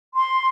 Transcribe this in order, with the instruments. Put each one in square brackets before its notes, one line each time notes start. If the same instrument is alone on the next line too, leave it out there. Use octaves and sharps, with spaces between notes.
[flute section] C6